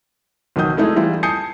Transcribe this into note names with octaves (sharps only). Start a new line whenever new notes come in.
B1 D#3 F3 F#5 D#6 G6
G#3 A3 D#4 E4 G#4
E3 G3 E4 F4
G#5 A5 D#6 G6 C7 C#7